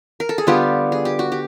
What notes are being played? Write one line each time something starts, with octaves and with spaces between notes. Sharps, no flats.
A#4
A4
G#4
D3 G3 B3 F4 G4
G#4
G4
F#4
G4